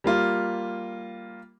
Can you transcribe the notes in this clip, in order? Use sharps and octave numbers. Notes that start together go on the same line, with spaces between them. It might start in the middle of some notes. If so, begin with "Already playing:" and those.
G3 A#3 F4